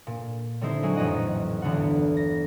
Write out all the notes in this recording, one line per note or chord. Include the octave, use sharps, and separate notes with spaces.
A#2
D3 G3 C4 D#4 E4 C5
F#3 G#3 E4 F#4 G#4
A1 F2 D#5 F#5
G1 E2 D3 B3 F#5
A#6